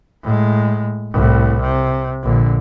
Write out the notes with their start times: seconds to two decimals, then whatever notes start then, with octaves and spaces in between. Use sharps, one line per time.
0.24 A2 G#3
1.13 C2 A2
1.62 C3
2.23 A#1 D3